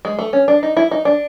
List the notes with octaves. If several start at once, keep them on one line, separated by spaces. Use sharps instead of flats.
G#3
A3
C#4
D4
D#4
E4
D#4
D4